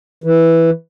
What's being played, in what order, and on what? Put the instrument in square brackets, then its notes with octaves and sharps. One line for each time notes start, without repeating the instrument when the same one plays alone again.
[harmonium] E3